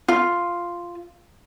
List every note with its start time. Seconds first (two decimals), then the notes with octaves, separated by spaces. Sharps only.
0.08 F4